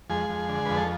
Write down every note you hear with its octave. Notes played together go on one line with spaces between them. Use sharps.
F2 G#3 G#4
F2
D3
F2 B4
A4